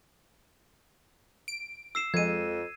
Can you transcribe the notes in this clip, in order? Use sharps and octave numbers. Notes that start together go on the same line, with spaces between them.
D7
E6 C7 E7
F2 F3 G#3 G#6 D#7